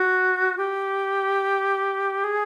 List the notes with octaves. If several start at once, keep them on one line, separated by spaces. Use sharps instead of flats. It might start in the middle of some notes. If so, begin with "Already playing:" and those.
Already playing: F#4
G4
G#4